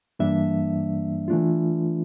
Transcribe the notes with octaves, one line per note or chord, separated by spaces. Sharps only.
G2 E3 G3 A#3 D4 E5
E3 A3 D4 F4